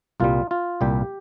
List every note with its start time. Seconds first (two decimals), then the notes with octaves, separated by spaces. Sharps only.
0.20 C2 A#2 G3 F4
0.51 F4
0.81 C2 A#2 G3 G4